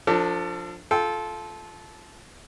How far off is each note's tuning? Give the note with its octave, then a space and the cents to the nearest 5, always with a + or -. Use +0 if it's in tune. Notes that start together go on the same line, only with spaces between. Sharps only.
F3 +15 D4 +0 A4 +40
F4 +0 A4 -20 G5 +0